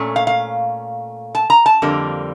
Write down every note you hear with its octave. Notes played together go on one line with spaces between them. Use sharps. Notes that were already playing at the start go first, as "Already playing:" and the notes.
Already playing: A#2 A3 C#4
F5
F5
A5
A#5
A5
F2 D3 G3 A#3